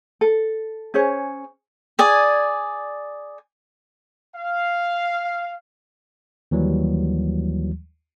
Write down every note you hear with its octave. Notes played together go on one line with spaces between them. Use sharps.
A4
C#4 G#4 C5 C#5
G#4 D5 G#5
F5
D#2 E3 F#3 G3